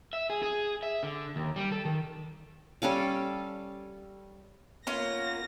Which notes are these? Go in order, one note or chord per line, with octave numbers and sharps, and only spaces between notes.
E5
G#4
G#4
E5
D3
D#2
G3
A4
D#3
G3 C#4 A4 F5
A#3 B3 C#4 F4 F5 A#6